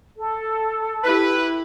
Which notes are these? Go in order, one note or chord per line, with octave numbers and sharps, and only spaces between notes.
A4
E4 G4 B4